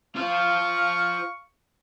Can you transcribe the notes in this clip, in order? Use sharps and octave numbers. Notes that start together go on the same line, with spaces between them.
F4 C5 F5 C#6